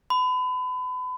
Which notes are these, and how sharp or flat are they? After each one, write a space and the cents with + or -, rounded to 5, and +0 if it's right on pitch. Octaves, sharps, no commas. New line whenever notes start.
B5 +35